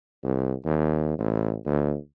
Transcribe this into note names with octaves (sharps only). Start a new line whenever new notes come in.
C2
D#2
A1
D2